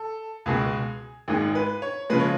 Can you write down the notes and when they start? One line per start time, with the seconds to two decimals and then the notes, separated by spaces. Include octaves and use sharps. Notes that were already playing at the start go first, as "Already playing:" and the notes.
Already playing: A4
0.46 C#2 B2 G#3 G#4
1.28 G#1 G#2 G#3 G#4
1.55 B4
1.82 C#5
2.10 C#3 F3 G#3 B4
2.20 C#5